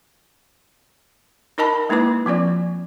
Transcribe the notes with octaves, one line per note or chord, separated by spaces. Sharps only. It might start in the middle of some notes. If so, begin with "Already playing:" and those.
D#4 A#4 D#5 A5 B5
G#3 A#3 D#4 E4 B4 D6
F3 C4 F4 D5